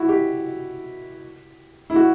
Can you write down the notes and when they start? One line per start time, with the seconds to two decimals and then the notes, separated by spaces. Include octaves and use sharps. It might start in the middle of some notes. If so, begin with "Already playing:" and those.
Already playing: E4 F#4
0.09 G4
1.90 E4
1.96 F#4